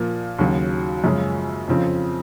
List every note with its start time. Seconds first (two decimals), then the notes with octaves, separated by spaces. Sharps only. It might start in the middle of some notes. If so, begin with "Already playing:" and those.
Already playing: A#2 F3 A#3
0.38 D#2 C#3 F#3
1.04 F#2 C#3 F3 G#3 C#4
1.68 F2 C#3 F3 C4